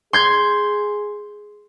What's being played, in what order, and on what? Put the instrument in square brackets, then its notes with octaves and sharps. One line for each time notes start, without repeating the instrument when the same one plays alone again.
[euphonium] G#4 [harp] C6 G6 G#6